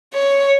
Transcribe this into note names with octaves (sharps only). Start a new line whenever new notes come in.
C#5